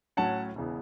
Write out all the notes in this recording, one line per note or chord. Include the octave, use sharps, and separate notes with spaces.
A2 F#3 C#4 F#5 A5
E1 C#3 E3 B3